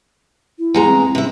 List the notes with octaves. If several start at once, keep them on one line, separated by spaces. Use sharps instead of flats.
E4
E2 G#3 A#5
C4
C3 E4